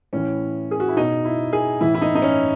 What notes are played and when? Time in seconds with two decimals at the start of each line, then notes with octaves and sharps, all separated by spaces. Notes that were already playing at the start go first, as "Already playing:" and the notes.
0.13 A2 E3 C#4
0.71 G#4
0.80 F#4
0.88 E4
0.97 B2 D#4
1.25 E4
1.53 G#4
1.81 A2 E3 E4
1.95 E4
2.02 D#4
2.15 D#4
2.22 C#4